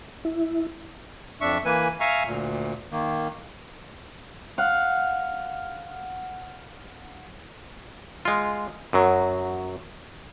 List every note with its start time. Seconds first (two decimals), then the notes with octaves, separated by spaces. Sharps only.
0.25 E4
1.41 F2 D4 E5 C#6
1.65 E3 A#3 B4 G#5
2.00 E5 F5 G#5 A#5 C#6 F6
2.26 D2 A#2
2.91 D#3 A#3
4.58 F5 F#5
8.25 G#3 F4
8.93 F#2 F#3